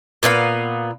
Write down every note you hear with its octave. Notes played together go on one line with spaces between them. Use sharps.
A#2 B3 D#4 F5